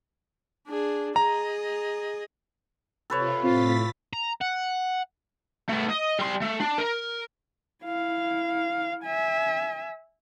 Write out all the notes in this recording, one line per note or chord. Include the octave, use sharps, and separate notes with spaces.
D4 G#4
G#4 D#5 A#5
C3 F4 A4 B4 C#5
A2 C4 F4 A6 B6
A#5
F#5
A3 B3
D#5
G3 C6
A3
D4
A#4
E4 F5
E5 G#5